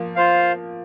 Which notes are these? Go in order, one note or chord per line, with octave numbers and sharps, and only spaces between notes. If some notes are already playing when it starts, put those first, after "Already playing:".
Already playing: F3 A#3
F4 C5 F5